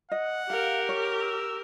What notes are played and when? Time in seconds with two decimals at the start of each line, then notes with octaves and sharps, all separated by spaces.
0.11 D#5 F#5
0.50 G4 A#4 F5
0.89 C#5
1.22 E6